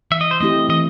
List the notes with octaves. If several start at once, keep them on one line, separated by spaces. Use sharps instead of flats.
E3 E5
D#5
C5
A3 C4 E4 G4 D#5
E3 D#5